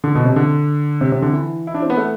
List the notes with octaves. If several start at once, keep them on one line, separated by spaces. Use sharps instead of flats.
D3
B2
C3
D3
C3
C3
D3
E3
E4
D4
C4
B3
A3